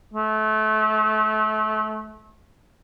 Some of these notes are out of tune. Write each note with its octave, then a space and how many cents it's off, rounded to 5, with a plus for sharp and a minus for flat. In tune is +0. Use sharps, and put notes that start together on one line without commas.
A3 -30